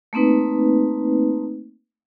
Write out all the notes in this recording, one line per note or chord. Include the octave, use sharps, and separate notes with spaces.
A3 A#3 C4 D#4 B4